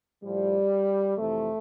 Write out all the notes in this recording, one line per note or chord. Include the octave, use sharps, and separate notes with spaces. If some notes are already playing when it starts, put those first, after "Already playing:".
A2 F3 G3
F2 C3 E3 A3